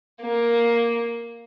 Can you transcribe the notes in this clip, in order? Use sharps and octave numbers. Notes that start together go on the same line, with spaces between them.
A#3